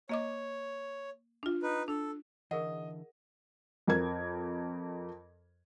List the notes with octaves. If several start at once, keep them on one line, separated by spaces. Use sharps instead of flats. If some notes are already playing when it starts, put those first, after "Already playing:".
A#3 C#5 D#5 D6
D4 F4
D#4 B4
D4 A4
D3 E3 G#4 A#4 D#5 F#5
F2 A#4 G#6